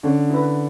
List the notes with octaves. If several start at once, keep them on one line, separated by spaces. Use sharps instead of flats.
D3 C#4
E4 B4